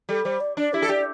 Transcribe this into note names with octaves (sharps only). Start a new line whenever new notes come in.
G3 A4
G3 C5
D5
D4 D5
E4 G4
A4
G4 D5